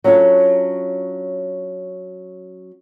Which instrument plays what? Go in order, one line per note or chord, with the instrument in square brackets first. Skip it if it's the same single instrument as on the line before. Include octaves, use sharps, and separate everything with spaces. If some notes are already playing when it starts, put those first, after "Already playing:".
[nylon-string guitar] F#3 C#4 D4 F4 A4 C#5